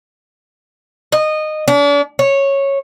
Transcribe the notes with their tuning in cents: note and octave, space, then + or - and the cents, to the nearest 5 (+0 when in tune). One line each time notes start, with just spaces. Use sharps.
D#5 -15
D4 -40
C#5 -10